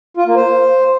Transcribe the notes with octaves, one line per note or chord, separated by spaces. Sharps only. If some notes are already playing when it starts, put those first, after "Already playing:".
F4
A#3
C5